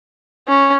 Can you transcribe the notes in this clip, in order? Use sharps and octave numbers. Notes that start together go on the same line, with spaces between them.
C#4